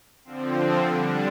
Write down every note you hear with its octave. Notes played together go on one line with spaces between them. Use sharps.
D3 F3 C4
D3 G3 D4